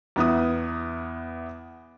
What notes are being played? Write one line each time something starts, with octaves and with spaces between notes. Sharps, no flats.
E2 B3 E4 D#6